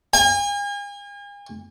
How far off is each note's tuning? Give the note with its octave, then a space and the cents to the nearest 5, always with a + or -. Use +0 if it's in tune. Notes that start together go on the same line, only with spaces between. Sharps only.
G#5 -40